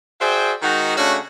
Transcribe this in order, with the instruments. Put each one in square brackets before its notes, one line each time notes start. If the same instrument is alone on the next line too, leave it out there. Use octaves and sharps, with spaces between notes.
[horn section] F#4 G#4 C5 D5 E5 G5
D#3 G#3 D#4 F#4
C#3 A3 C#4 D4 F#4